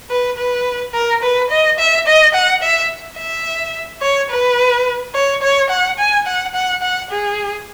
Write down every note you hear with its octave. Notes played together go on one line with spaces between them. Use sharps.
B4
B4
A#4
B4
D#5
E5
D#5
F#5
E5
E5
C#5
B4
C#5
C#5
F#5
G#5
F#5
F#5
F#5
G#4